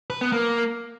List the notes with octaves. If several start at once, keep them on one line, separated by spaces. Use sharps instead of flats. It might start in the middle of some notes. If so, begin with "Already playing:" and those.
B4
B3
A#3